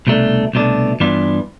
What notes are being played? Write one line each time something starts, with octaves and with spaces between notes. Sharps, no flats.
C2 B2 A3 D4
C2 B2 A3 D4
G2 E3 B3 D4 F4